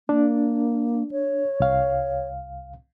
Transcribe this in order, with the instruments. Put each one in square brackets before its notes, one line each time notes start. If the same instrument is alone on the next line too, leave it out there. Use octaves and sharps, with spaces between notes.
[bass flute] A#3 [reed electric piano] D4
[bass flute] C#5
[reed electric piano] C2 F5